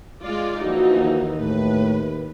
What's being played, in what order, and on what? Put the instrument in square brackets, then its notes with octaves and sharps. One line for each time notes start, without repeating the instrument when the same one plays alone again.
[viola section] G#3 F4 D5
[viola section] E3 D#4 [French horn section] F3 A#3 F#4
[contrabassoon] D#2
[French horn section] A2 [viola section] B4